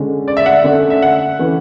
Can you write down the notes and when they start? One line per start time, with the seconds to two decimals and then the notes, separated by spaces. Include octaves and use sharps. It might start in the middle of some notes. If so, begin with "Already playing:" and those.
Already playing: D3 G#3 C#4
0.28 D5
0.37 E5
0.46 F#5
0.64 D3 A3 C#4
0.90 E5
1.02 F#5
1.39 E3 A3 C#4